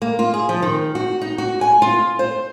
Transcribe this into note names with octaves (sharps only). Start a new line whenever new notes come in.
A#3
F4
G#4
F3
D#3
F#4
D#4
F#4
G#5
F4
C5